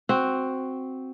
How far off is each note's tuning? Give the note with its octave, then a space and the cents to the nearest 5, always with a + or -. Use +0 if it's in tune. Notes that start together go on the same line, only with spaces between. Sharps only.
C4 +0 F#4 +0